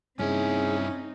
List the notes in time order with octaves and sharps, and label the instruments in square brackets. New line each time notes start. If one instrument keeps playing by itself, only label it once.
[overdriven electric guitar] G2 E4 [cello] C4 D#4 [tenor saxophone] C#4 [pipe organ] G#4